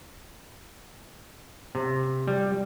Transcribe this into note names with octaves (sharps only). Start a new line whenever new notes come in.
C3
G3